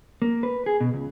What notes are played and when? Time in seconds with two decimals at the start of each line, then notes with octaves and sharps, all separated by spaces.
0.22 A#3
0.43 B4
0.66 G#4
0.80 B2
0.94 C#2